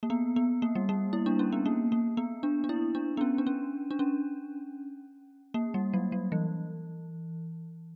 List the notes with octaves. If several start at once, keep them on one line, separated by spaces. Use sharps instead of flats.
A#3
B3
B3
A#3
G3
A#3
E4
D4
C#4
B3
A#3
A#3
B3
D4
D4
E4
D4
B3
C#4
D4
C#4
D4
C#4
A#3
G3
F#3
F#3
E3